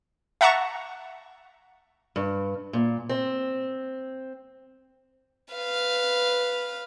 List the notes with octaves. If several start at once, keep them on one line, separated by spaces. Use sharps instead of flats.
E5 F#5 A5 A#5 C#6
G2
A#2
C4
B4 F5